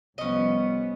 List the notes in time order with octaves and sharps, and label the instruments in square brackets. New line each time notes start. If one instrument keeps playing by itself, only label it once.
[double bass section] C2 F3 G3 [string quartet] B3 [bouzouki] C#4 D#5